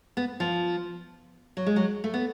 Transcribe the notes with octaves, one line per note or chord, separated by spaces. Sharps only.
B3
F3
F#3
G#3
F#3
A3
B3